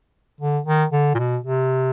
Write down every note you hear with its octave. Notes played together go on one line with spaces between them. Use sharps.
D3
D#3
D3
A#2
B2
C3